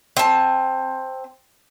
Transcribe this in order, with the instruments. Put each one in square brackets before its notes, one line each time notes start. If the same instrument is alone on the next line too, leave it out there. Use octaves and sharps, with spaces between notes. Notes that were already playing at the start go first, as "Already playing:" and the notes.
[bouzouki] C4 A5